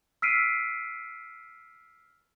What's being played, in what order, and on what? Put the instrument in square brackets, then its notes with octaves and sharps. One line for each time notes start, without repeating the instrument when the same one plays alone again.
[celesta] E6 F6 B6 C7 D7 D#7